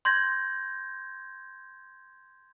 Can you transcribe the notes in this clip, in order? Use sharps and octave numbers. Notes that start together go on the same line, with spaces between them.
C6 G6 G#6 A#6